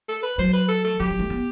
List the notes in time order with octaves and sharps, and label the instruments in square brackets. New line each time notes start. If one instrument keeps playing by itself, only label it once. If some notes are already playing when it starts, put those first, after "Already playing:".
[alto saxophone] A4
B4
[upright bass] F#3 [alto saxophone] C5
[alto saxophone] B4
A4
A4
[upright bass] F#3 [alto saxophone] G4
[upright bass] F#3
A3
B3